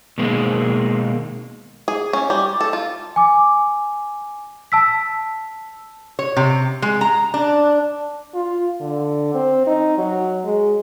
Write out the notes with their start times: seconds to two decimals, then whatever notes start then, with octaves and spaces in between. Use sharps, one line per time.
0.18 B2 D#3 G#3 A#3 C4
1.88 G#4
2.13 C#4
2.30 G3
2.61 A4
2.73 F4
3.16 G#5 D6
4.72 A5 E6 B6
6.19 C#5
6.37 C3
6.82 G#3
7.01 A#5
7.34 D4
8.35 F4
8.80 D3
9.34 C4
9.67 D#4
9.98 F#3
10.45 G#3